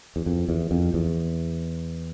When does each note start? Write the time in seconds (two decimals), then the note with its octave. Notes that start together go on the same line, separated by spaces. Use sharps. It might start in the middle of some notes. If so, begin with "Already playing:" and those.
0.16 E2
0.26 F2
0.49 E2
0.71 F2
0.94 E2